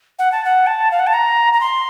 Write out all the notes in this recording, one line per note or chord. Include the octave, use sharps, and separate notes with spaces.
F#5
A5
F#5
A5
F5
F#5
A5
A#5
A#5
C6